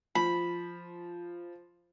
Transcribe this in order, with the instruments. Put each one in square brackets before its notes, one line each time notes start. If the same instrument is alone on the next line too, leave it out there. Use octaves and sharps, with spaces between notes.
[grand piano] F3 [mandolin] B5